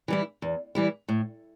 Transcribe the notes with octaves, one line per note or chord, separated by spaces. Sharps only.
E3 G3 E4
E2
E3 G3 E4
A2